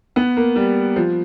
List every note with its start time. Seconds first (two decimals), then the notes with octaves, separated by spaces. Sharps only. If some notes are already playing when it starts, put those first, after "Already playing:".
0.16 B3
0.37 A#3
0.56 G3
0.96 F3